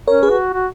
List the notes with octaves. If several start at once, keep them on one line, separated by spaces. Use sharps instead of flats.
C#4 A#4 C#5
G#4 B4
F#4
F#4